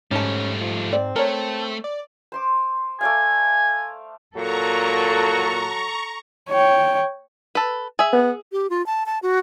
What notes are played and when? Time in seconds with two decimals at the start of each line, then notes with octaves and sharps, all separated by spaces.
0.11 G#2 G3 A3 C#4 D#4 A5
0.60 F3
0.93 C4 D5
1.16 A3 A#4 C#5 A5
1.84 D5
2.32 C5 C6 D6
3.01 A3 D5 F5 G#5
4.36 A#2 F#3 F#4 A4 A#5 C#6
6.50 C#5 G5
7.55 A4 B4
7.99 G#4 E5
8.13 B3
8.51 G4
8.70 F4
8.86 A5
9.06 A5
9.23 F#4